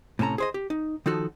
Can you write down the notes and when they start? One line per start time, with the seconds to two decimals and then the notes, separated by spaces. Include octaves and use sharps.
0.19 A2 C3 C#4 A5 A#5
0.38 G#4 C5 D#5
0.54 G4
0.70 D#4
1.06 D#3 F3 D#4 F#4 A4